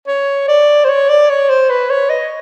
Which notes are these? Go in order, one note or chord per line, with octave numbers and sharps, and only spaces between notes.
C#5
D5
C5
C#5
D5
C#5
C5
B4
C#5
D#5